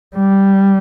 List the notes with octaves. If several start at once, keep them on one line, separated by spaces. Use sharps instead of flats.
G3